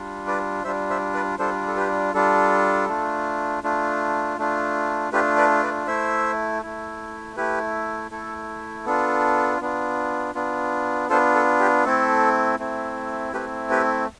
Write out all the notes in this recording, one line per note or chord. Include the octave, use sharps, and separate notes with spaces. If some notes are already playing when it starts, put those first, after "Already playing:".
Already playing: G3 D4 F4
B4 D5
G3 D4 F4 C5 E5
C5 E5
B4 D5
G3 D4 F4 A4 C5
A4
G4 B4
G3 D4 F4 A4
A3 D4 F4
A3 D4 F4
A3 D4 F4
A3 D4 F4 G4 B4
B4 D5
B4 D5
A3 E4 C5 E5
A3 E4
A3 E4 G4 B4
A3 E4 A4
B3 D4 F4 A4
B3 D4 F4
B3 D4 F4
B3 D4 F4 A4 C5
A4
G4
A3 C4 E4 A4
A3 C4 E4
A3 C4 E4 G4 B4
G4 B4